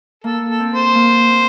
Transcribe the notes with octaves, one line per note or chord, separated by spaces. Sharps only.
A#3 A4
A4
C4
C5
A#3
C4